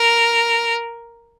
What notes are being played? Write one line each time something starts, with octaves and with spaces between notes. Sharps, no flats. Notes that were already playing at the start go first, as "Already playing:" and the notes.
Already playing: A#4